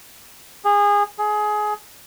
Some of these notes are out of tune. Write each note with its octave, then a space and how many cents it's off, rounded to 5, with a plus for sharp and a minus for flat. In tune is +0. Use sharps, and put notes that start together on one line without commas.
G#4 -25
G#4 +20